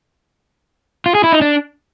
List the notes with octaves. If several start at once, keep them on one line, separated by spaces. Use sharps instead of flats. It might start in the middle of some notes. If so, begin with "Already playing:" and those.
F4
G#4
E4
D#4
D4